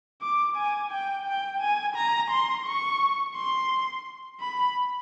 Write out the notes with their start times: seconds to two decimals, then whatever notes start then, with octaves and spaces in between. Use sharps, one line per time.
0.21 D6
0.56 G#5
0.91 G5
1.26 G5
1.61 G#5
1.96 A#5
2.30 C6
2.66 C#6
3.35 C6
4.41 B5